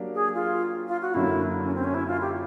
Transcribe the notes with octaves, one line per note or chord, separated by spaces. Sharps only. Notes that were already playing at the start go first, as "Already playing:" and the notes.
Already playing: F#3 A#3 D4 G4
G#4
F4
F4
F#4
F#2 D3 F#3 A#3 E4
D4
C#4
C4
C#4
E4
F4
G4